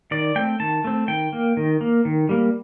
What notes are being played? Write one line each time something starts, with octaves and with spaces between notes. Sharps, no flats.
D#3 D5
A3 C4 G5
D#3 A5
A3 C4
D#3 G5
A#3
D#3
A#3
D#3
G3 A#3